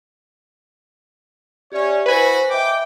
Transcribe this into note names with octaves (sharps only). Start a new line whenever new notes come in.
C#4 G4 C#5 D5 E5
E4 F#4 B4 C5 G#5 B5
D#5 E5 G5 D6